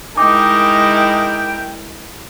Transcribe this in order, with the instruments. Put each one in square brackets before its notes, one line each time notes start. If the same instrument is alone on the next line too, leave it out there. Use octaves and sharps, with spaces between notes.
[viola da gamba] G#3 E4 A#4 [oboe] D#4 [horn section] G5 [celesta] D6